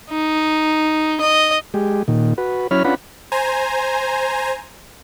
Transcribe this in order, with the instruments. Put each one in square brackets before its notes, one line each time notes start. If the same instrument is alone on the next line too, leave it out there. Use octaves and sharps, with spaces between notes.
[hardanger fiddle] D#4
D#5
[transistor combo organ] G#3 G4
A#2 D#3
F#4 B4
F#3 C#4 E4 C#5 B5 F6
C#4 D4 F4 B4 F#5 B5
[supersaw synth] C5 G#5 A#5